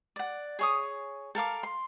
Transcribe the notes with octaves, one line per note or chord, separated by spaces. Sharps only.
D5 F#5
G#4 C#5 D#6
A4 A#4 F5 D6
C6